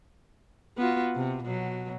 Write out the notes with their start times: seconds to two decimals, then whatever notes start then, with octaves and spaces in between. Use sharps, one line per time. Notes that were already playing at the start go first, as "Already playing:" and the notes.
0.78 B3 F4 F#4
1.15 C3
1.44 B2 F#3